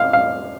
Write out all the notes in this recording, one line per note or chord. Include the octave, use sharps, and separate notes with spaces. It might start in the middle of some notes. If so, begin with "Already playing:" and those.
Already playing: F5
F5